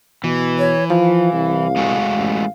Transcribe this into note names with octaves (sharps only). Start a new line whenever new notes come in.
B2 E3
C#5
F3 F5
C2
G#3 A3 F#4
A1